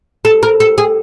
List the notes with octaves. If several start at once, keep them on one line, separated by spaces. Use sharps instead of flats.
A4
A#4
A4
G#4